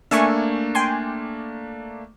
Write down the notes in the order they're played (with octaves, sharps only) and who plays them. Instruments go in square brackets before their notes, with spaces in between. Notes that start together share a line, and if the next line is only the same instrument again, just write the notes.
[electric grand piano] A3 A#3 D4 [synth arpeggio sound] E5 G#5 C#6
[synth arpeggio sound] G5 G#5 C6